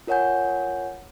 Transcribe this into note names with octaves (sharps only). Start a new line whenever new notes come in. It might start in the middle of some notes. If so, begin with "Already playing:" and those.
F4 A#4 C#5 F#5 G#5 G6